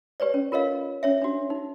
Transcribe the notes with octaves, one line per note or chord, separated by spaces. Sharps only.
G4 B4 C#5 D5
C#4
F4 A#4 C#5 D#5 F5
C#4 C#5 E5
D4 F#4
D#4